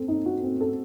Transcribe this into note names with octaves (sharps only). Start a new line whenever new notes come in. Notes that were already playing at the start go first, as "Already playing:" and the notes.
Already playing: C4 A4
D#4
F#4
C4
A4